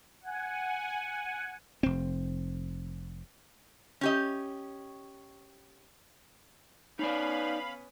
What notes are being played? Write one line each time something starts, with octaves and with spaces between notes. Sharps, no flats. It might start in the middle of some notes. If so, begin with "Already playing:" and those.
F#5 G#5
F1 C4
C#4 G4 D#5
B3 C#4 D#4 B4 D5 F5 B5